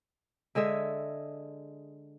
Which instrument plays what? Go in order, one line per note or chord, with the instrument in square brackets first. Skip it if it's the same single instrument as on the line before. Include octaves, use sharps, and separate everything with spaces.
[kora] D3 G#3 G#4 E5